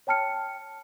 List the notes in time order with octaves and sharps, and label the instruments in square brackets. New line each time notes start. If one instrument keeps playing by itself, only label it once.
[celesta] C#5 G5 A5 F6 C#7